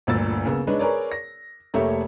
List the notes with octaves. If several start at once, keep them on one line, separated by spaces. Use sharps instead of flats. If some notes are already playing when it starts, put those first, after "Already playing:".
G1 D2 A#2 E6 A6
C#3 A#3 B3 C#4
G#3 D4 D#4 B4 C#5 D5
G#4 A#4 B4 C#5 D5
A#6
F1 A3 A#3 G4 C#5 E5